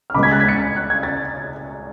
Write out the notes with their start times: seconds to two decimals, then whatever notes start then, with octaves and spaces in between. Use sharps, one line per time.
0.10 F6
0.14 C#2 C#3 G#3 B3 B5 D6
0.23 G#6 B6
0.31 F#6 A6
0.40 G#6 B6
0.49 A6 C#7
0.76 F#6
0.90 G#6
1.03 A6